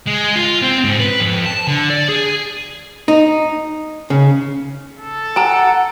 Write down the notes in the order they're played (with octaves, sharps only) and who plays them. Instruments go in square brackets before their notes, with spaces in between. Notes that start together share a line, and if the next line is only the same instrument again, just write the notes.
[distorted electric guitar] G#3
F4
C4
G#2
B4
F2
A5
D3
D5
G#4
[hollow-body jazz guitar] D#4
C#3
[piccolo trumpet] A4
[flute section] F#5 [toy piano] G#5 A#5